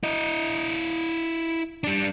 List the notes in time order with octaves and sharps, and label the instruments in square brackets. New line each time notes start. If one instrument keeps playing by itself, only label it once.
[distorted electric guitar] E4 D#5
G3 D4